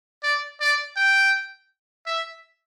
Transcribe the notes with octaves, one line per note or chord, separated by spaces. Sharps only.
D5
D5
G5
E5